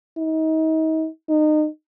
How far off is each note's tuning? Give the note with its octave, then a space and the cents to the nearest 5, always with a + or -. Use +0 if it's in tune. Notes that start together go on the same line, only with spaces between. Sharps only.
D#4 +35
D#4 -30